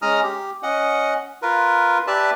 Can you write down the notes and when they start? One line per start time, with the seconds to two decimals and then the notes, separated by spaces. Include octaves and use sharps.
0.02 G#3 C#4 A#5 D#6 F6
0.23 G4
0.63 C#4 D#5 F#5
1.42 F4 A#4 B4
2.07 G4 B4 D5 E5 A5